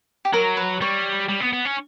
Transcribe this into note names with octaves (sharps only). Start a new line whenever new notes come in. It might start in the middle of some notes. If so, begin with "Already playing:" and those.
G4
F#3 A#4
B4
G3 C#5
G3
B3
B3
C#4